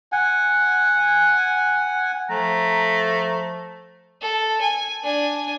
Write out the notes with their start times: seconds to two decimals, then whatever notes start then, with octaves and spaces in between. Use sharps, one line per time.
0.12 F#5 G#5
2.30 F3 A3 A#5
4.21 A4
4.61 G#5
5.03 D4 G#5